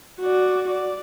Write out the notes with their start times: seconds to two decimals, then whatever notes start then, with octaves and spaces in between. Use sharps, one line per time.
0.20 F#4 D5
0.70 D5